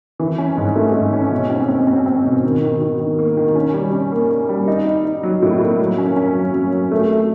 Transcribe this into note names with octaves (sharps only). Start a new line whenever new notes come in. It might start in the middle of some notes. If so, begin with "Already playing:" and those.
E3
C#4
G#2
A3
G#2
C#4
B2
C4
C4
C4
C4
B2
D#3
D#3
D#3
D#3
A#3
D#3
C#4
G3
C#4
A#3
A#3
G3
D#4
D#4
D#4
F#3
A2
A#3
F#3
C#4
C#4
F#3
F#3
F#3
A3
A3